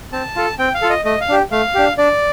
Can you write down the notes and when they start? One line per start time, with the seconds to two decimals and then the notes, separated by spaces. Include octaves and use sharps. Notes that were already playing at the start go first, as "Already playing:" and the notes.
0.12 C4 A5
0.36 F4 A4
0.59 C4 G5
0.74 F5
0.82 F4 A4
0.90 D#5
1.05 A3 D#5
1.21 F5
1.28 D4 G4
1.52 A3 F5
1.75 D4 G4
1.98 D4 D5